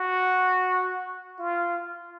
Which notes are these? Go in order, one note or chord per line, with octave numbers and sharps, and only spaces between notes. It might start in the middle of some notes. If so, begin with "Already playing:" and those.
Already playing: F#4
F4